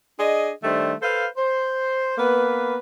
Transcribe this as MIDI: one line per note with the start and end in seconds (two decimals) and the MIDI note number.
0.19 0.50 62
0.19 0.50 68
0.19 0.50 75
0.64 0.93 51
0.64 0.93 55
0.64 0.93 57
0.64 0.93 62
0.64 0.93 72
1.02 1.26 69
1.02 1.26 71
1.02 1.26 72
1.02 1.26 77
1.37 2.18 72
2.18 2.77 58
2.18 2.77 59
2.18 2.77 71